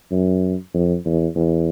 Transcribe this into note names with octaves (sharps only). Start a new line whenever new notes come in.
F#2
F2
E2
E2